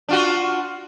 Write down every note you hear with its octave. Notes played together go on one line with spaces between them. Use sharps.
D4 F4 F#4